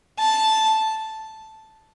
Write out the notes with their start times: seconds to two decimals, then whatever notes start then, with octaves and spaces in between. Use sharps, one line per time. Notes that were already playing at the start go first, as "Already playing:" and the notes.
0.19 A5